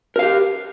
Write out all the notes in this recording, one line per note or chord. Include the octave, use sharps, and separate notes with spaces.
G4 A#4 F5